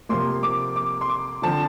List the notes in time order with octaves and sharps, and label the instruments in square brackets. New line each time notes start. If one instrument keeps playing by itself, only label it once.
[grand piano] C3 F3 A#3 [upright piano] C6
[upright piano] D6
D6
C6
D6
[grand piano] D3 F3 C4 F4 [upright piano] A5